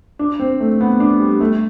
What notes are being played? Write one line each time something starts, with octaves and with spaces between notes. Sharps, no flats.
D4
C4
A3
B3
D4
G3
A3